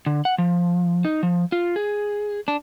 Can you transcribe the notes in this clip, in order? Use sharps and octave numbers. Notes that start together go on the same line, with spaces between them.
D3
F#5
F3
D#4
F3
F4
G#4
D4